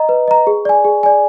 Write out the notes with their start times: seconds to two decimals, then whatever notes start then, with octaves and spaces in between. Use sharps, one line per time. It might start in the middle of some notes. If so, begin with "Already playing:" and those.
Already playing: D#5 A#5
0.09 B4
0.28 D#5 A#5
0.47 G#4
0.65 D5 G#5
0.85 G#4
1.03 D5 G#5